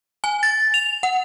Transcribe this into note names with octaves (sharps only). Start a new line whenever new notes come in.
G#5
A6
F7
F#5